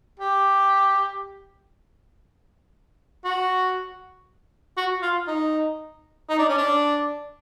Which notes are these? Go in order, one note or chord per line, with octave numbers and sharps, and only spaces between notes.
G4
F#4
F#4
F4
D#4
D#4
D4
C#4
D4